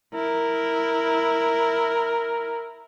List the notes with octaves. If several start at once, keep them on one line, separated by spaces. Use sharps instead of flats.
E4 A#4